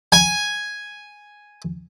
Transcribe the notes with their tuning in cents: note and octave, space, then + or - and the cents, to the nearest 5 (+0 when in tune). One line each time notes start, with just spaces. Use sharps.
G#5 +0